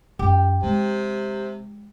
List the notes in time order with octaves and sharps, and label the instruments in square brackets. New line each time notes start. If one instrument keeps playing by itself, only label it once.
[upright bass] F#2 F4 [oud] G4
[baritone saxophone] C3 [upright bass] F3 G#3